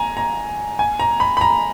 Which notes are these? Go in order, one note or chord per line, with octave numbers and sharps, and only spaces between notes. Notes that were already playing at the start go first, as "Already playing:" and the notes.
Already playing: G#5 A#5
A#5
G#5
A#5
B5
B5
A#5